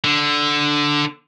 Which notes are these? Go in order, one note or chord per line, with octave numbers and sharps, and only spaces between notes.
D3